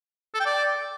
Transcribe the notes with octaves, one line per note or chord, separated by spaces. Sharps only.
A4
G5
D5